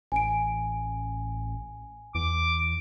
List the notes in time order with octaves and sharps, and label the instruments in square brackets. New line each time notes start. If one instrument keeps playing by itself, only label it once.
[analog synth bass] A1 [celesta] G#5 D7
[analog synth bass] E2 [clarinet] D6